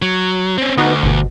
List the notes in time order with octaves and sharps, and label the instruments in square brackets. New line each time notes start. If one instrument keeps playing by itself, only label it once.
[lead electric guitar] F#3
C4 C#4
[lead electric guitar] D2 [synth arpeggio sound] B3 D#4 F#4
[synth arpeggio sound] G1 B2